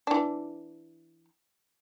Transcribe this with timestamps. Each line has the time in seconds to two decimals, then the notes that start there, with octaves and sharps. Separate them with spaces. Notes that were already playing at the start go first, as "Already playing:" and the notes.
0.07 E3 D4